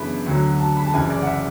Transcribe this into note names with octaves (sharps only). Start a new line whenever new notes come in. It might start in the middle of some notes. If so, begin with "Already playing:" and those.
Already playing: F#2 C#3 E3 B3 D4 B5
D2 D3 F#3
A5
B5
A5
F#1 F#2 E3 G#3 G#5
D5
F#5
E5